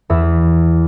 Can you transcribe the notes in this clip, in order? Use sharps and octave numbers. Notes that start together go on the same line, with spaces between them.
E2 E5